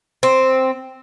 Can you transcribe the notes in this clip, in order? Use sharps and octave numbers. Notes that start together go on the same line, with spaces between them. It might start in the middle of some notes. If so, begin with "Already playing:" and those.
C4